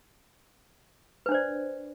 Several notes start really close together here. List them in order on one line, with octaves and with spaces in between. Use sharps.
B4 D4 C5 D5